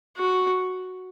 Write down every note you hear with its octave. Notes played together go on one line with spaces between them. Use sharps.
F#4